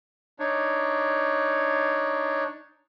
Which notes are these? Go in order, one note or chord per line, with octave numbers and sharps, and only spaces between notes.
D4 D#4 C#5